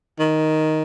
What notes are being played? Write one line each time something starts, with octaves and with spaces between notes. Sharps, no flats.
D#3